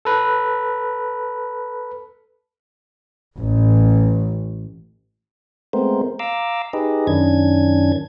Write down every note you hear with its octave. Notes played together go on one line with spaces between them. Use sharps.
A4 B4
A1
G#3 A3 B3 C4 A#4 C5
F5 A#5 D6 E6
D#4 G4 G#4 B4 D#5
F#2 D#3 C#4 D4 G#6